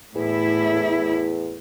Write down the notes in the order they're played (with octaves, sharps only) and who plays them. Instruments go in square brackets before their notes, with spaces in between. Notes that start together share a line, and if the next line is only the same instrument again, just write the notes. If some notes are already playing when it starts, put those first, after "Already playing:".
[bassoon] E2 [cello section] A2 E4